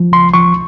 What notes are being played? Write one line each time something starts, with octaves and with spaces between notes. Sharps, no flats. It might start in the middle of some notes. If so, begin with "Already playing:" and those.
Already playing: F3
C#2 C6
F3 C#6